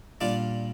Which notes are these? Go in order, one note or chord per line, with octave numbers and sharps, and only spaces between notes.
A#2 G3 D4 F4 D5